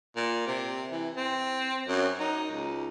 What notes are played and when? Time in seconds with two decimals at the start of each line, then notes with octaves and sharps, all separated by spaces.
0.16 A#2
0.47 C3
0.92 E3
1.16 C4
1.88 F#2
2.19 D#4
2.51 C#2